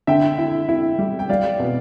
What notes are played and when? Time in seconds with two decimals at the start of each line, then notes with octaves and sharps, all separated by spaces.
0.07 D3 E5 G5
0.38 E4
0.69 E4
0.99 G3
1.19 G5
1.29 G3 D5 F5
1.60 B2